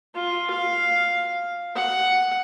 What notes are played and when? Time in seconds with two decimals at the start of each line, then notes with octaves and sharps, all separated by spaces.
0.15 F4
0.50 F5
1.76 F#5